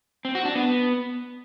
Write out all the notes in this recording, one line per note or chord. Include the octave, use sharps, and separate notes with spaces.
C4
F#4
D4
B3